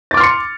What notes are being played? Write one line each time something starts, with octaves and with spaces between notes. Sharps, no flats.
C6 D6 F6 A6 C#7